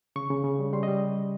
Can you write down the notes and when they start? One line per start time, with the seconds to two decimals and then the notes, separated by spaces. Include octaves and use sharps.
0.16 C#3 C#6
0.30 C#3
0.44 C#3
0.59 G3
0.73 G3 C6
0.83 D#5
0.88 G3